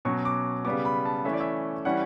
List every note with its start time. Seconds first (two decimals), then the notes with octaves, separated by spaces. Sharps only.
0.05 B2 F#3 C#4 C#6
0.25 D6
0.65 C#3 G3 B3 D6
0.85 B5
1.05 A5
1.25 E3 A3 C#4 E5
1.33 D5
1.40 E5
1.85 E3 G3 C#4 F#5